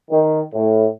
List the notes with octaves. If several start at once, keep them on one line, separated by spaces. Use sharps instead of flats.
D#3
A2